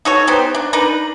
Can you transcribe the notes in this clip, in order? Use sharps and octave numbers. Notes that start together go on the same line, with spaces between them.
D#4 F#4 A4 C#5
B3 D#4 G4 C5
D4
D4 D#4 A#4 B4